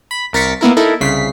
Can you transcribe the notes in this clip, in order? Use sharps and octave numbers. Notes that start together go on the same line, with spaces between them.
B5
C2 A#4 A6 B6 C#7
A#3 B3 E4 A#4
D#4 E4 A4 A#4
C2 C#3 B6 C7